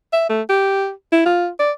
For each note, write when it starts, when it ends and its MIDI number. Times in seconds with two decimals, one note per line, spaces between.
0.13 0.26 76
0.30 0.42 57
0.50 0.91 67
1.12 1.22 64
1.25 1.48 65
1.59 1.72 74